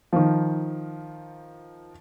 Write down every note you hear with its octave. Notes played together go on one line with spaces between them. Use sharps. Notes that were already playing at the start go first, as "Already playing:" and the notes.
D#3 F3